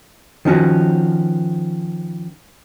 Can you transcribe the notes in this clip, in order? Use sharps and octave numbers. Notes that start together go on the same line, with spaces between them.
D#3 F3 C#4 F#4